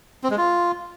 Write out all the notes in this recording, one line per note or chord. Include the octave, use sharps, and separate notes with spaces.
C4
G#3
F4